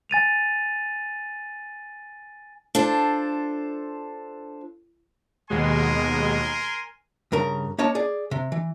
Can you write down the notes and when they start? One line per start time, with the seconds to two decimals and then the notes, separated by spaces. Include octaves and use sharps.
0.10 G#5 A6 D#7 F7
2.75 D4 F4 A4 C5
5.50 D#2 B2 G#3 A#4 G#5 C6
7.32 G2 C#3 A#4
7.79 A#3 C#4 C#5 D#5 A5
7.95 G#4 D5
8.31 C3
8.52 E3